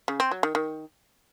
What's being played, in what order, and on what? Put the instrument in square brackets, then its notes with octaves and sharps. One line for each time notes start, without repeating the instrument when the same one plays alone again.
[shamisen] C#3
C4
F#3
D#3
D#3